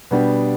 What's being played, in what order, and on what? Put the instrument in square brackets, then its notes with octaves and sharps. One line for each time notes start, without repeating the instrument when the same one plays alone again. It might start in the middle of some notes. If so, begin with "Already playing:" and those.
[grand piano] B2 G3 B3 D4 G4